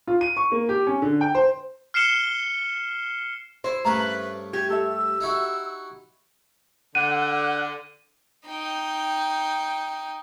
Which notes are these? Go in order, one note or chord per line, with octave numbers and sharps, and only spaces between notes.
F4
D#7
C#6
A#3
G4
C#4
D3
G5
C5
F6 C7 C#7 E7 G7
E4 C5
G2 A3 C#4 A#4 B4 A#5
G4 G#6
A4 E5 E6
D#4 E4 F#4
D3 F#5 D#7
D#4 G5